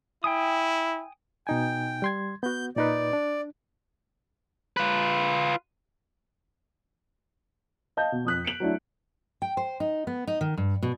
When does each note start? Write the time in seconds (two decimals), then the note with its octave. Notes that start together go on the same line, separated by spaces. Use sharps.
0.24 E4 G5 G#5 D#6
1.47 B2 D#4 G5 G#5
2.02 G3 C6 G#6
2.43 B3 F#4 G6
2.76 A#2 D#4 B4 D5
3.13 D4
4.77 F4 B4
7.97 D#5 F5 A5 G6
8.12 B2
8.25 F2 D#6 F#6 B6
8.45 C#7 D7 F#7
8.60 F#3 A3 D4 E4
9.42 G5
9.57 C5
9.80 D#4
10.07 B3
10.27 D#4
10.41 D#3
10.58 G2
10.83 B2